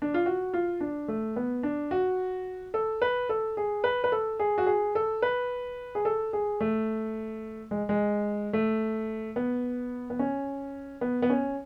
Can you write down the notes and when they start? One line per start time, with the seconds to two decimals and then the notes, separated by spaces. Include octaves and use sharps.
0.02 D4
0.14 F4
0.26 F#4
0.54 F4
0.81 D4
1.08 A3
1.36 B3
1.63 D4
1.91 F#4
2.74 A4
3.02 B4
3.29 A4
3.57 G#4
3.84 B4
4.04 B4
4.12 A4
4.40 G#4
4.58 F#4
4.67 G#4
4.95 A4
5.22 B4
5.95 G#4
6.05 A4
6.33 G#4
6.60 A3
7.71 G#3
7.89 G#3
8.53 A3
9.36 B3
10.10 B3
10.19 C#4
11.01 B3
11.22 B3
11.30 C#4